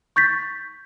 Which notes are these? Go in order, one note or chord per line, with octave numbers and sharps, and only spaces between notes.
C#6 G6 A6 B6